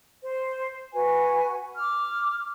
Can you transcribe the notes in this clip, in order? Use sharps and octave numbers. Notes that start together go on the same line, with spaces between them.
C5
F#4 B4 G#5
D6 F6